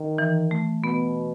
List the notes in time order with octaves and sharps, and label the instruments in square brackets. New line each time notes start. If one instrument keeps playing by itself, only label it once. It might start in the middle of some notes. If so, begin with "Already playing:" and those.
Already playing: [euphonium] D#3
[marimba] E3
A3
[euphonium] B2 [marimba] B3